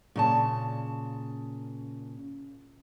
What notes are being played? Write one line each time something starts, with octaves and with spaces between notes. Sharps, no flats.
A#2 C#3 A5